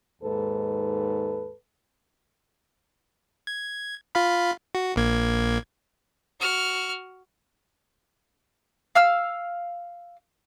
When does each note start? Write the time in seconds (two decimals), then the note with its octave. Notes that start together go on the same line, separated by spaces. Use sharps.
0.22 D#2 G#2 A4 B4
3.47 G#6
4.15 F4 F5 B5
4.75 F#4
4.96 A#1 A#3 G#6
6.40 F#4 F6
8.95 F5 E6 F6